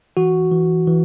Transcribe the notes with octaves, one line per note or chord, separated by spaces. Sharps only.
E3 F#4
E3
E3